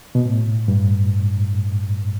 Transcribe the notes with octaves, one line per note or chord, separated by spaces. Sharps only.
B2
A2
G2